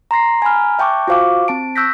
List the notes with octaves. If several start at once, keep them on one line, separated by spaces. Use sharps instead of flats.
A#5 C6 A#6 C7
G#5 A#5 B5 F6
E5 G5 A5 C#6 D6 F#6
F4 F#4 C5 F5 C#6 D6
C4 A5 D7
C#6 E6 F#6 G6 A#6 B6